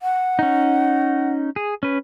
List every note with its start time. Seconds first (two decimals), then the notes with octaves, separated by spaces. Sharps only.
0.02 F#5
0.39 C#4 D#4
1.56 G#4
1.83 C#4 B4